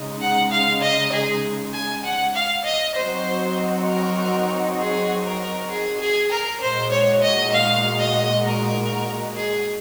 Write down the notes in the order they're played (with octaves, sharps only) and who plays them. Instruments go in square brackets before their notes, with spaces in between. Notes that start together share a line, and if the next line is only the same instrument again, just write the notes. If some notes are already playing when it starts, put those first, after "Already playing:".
Already playing: [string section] C#3 G#3 D#4
[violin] F#5
F5
D#5
G#4
G#5
F#5
F5
D#5
[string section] F#3 C4 D#4 F#4 [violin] C5
[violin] A#4
G#4
A#4
G#4
G#4
A#4
[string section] A#2 G#3 D#4 F#4 [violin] C5
[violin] C#5
D#5
F5
D#5
A#4
G#4